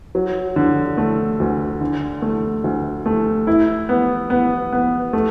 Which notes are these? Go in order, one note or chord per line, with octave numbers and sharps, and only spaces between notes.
F#3
D3
A3
D2
D3
A3
D2
A3
E4
B3
B3
B3
A3